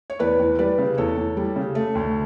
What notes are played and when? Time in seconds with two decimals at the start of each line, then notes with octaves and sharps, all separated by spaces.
0.10 C#5
0.19 E2 B4 D5
0.39 E2
0.59 G3 B4 D5
0.78 C#3
0.98 E2 A4 C#5
1.17 E2
1.37 G3
1.56 C#3
1.75 A3
1.95 D2